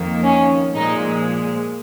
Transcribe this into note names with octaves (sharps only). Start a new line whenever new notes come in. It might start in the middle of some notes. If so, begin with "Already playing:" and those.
Already playing: F2 D#3 A#3
C#4
A#2 F3 G#3 D#4